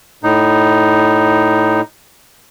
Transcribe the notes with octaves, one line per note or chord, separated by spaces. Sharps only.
A2 D#4